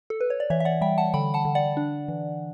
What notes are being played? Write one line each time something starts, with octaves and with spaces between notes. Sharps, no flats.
A4
B4
C#5
D5
E3 C#5 E5
E5
D5 F#5
G3 E5 G5
F#5 A5
D3 G5 B5
F#5 A5
D3
D5 F#5
D4
E3